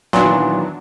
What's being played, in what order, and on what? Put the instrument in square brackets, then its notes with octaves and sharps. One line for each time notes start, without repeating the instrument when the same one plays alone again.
[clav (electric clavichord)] A#2 [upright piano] D#3 E3 B3 [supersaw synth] F#3 D4